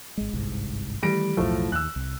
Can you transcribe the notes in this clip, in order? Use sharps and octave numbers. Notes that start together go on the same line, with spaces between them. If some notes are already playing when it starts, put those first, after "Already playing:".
G#1 G#3
G1 C2 G#2
D#3 E3 G3 A3 A#6 D7
B1 E2 A2 F3 F#3 A3
D#2 E6 F#6
C2